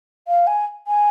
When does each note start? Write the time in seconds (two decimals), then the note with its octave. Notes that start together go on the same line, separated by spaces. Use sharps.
0.28 F5
0.47 G#5
0.87 G#5